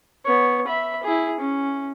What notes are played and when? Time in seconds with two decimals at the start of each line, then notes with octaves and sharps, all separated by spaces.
0.25 B3 C#5
0.67 E5 B5
1.03 E4 G#4
1.40 C#4